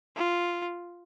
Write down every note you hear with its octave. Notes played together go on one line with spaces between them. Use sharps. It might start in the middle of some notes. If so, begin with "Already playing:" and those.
F4